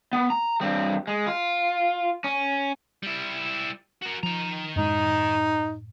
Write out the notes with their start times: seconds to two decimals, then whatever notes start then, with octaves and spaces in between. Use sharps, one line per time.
0.13 B3
0.30 A#5
0.61 G2 C4
1.07 G#3
1.27 F4
2.24 C#4
3.03 G3 E4
4.02 F#4 A#4
4.23 D#3 F3 A#5
4.76 F#2 A2 G#3 D#4